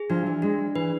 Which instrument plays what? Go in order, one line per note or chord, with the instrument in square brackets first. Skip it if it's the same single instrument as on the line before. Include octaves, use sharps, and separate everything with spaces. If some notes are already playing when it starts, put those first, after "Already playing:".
Already playing: [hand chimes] G#4
[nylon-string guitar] F3 [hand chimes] D4
[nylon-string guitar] E3
[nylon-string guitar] G#3 [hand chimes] D4
[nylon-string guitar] E3 [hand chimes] B4